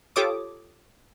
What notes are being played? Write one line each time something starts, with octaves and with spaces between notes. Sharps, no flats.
F4 G4 A4 C#5 D6 D#6